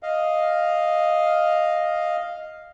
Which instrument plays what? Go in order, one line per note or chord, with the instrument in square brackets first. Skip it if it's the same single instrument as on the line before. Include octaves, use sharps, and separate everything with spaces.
[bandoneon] D#5 F5